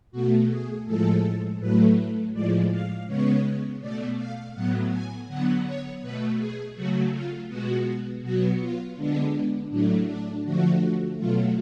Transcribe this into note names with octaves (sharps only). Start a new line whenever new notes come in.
B2 A3 F#4
G#4
A2 F3 G#3 A4
A2 F#3 A3 B4
A2 F3 G#3 D5
F5
C#3 G#3 B3 C#5
B2 A3 D5
F5
A2 F#3 B3 F#5
G#5
D3 F#3 B3 F#5
C#5
B2 A3 B4
G#4
C#3 F#3 A3 F#4
F4
B2 G#3 B3 F#4
B2 F#3 B3 F#4
F4
D3 G#3 B3 D4
A2 F#3 A3 D4
D4
D3 F3 A3 F#4
B2 F#3 A3 F4